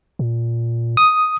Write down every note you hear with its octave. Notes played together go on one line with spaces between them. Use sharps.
A#2
D#6